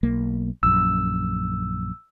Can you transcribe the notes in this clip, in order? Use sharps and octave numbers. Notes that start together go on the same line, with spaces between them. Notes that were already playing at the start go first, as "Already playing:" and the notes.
B1 A#3
A#1 F#2 E6